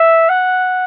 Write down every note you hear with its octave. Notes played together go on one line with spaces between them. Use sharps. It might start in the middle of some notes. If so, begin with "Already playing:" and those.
Already playing: E5
F#5